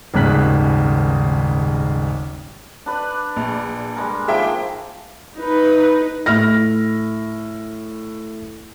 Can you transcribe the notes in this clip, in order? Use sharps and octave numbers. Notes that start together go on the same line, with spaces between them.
D#1 G#1 G#2 C#3 F#6 B6
D4 B4 D5
A#1
G3 G#3 A#4
D#3 F3 A#3 G#4 E5 G5
D#4 B4
A2 F6 A#6